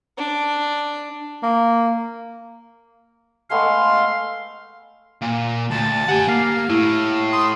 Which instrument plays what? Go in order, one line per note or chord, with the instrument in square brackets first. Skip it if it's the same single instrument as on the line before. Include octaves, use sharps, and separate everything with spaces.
[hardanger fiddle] D4
[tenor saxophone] A#3
[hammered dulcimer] G#3 A3 B3 [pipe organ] F5 C6
[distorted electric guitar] A#2
[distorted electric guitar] D2 [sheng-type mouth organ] A5
[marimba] G4 [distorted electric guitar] F#5 G#5
[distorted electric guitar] A#3 [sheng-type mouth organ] F5
[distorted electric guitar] A2 [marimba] E4
[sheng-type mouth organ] C6 D#6